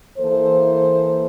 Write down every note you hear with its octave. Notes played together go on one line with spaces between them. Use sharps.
E3 A#3 A4 C5